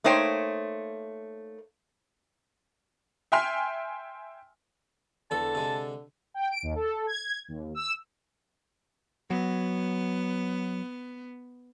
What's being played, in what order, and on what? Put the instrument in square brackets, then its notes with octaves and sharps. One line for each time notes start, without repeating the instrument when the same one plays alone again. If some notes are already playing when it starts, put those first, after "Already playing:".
[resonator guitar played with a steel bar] A3 A#3 D#4 C5 C#5 G5
[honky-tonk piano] E5 G5 G#5 C6 F6 B6
[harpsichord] E2 A4 [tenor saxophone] D3 [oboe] A5
[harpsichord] C3 G#3
[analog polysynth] G5
D7
D#2
A4
G#6
D#2
E6
[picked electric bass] F#3 [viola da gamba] B3